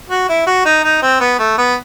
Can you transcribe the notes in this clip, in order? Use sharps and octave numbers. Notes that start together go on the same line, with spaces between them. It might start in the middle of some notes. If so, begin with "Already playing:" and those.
F#4
E4
F#4
D#4
D#4
C4
B3
A3
B3